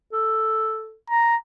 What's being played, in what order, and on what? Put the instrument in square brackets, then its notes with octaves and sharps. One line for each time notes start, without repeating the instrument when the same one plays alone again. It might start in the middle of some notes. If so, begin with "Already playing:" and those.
[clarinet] A4
[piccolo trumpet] A#5